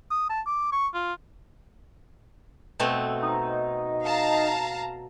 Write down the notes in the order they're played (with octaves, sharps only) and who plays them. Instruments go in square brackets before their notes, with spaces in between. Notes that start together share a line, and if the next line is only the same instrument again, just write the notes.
[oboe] D#6
A5
D6
C#6
F4
[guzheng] B2 A3 C4
[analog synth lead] D#4
[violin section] F5 A5 A#5